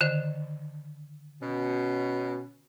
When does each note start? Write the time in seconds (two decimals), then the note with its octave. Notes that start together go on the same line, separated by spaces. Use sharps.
0.01 D3 D#3 C5
1.42 B2 C#4